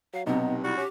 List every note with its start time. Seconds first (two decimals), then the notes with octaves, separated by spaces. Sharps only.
0.14 F#3 F5
0.26 B1 G2 C3 B3 D#4
0.64 G3 E4 F#4
0.77 C#4 G4